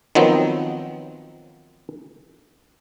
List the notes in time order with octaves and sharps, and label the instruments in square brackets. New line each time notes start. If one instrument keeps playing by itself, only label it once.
[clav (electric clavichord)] D#3 F3 F#3 B3 C4